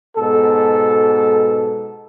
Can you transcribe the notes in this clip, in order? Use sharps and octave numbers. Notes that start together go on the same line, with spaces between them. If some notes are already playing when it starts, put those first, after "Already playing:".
G#2 B2 A4